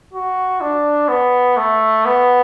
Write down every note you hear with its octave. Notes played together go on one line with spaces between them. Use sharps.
F#4
D4
B3
A3
B3